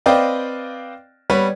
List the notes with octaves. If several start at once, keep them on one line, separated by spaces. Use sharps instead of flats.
C4 B4 D5 D#5 F5 G5
G3 B3 B4 C#5